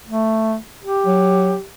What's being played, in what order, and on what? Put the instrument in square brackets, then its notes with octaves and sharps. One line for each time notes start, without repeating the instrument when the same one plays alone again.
[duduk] A3
G4
[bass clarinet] F#3